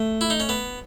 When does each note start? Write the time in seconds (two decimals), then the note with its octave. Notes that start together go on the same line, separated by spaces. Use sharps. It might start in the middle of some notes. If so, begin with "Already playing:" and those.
Already playing: A3
0.21 E4
0.30 D#4
0.40 C#4
0.49 B3